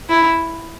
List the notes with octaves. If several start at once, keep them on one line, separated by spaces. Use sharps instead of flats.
E4